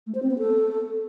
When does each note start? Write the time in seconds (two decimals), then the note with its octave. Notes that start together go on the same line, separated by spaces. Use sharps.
0.07 A3
0.15 C5
0.22 C4
0.30 B3
0.38 A4